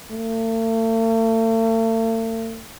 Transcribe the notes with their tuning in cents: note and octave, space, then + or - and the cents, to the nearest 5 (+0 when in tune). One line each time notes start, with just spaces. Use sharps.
A3 +40